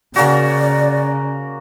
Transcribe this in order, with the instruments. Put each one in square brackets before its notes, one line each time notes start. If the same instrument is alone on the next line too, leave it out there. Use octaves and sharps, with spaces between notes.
[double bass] C#3 [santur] A#3 C#4 F#4 [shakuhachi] D5